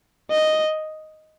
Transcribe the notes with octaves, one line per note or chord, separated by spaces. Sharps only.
D#5